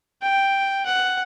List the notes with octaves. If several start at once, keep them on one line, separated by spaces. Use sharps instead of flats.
G5
F#5